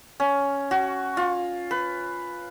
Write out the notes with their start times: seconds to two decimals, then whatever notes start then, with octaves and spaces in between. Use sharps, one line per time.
0.20 C#4
0.71 F#4
1.17 F4
1.71 B4